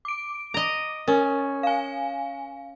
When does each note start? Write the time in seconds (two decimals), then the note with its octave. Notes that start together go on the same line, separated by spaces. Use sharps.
0.05 D6 D7
0.54 D#5 A#5
1.08 C#4 A#4
1.63 F5 G#5